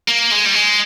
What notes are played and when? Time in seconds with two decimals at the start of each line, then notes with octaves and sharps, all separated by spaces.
0.08 A#3
0.31 G#3
0.46 G3
0.55 G#3